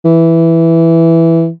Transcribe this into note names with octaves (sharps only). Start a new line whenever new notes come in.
E3